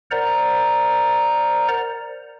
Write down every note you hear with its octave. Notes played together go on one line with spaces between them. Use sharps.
A#4 C5 D5 F#5 A#5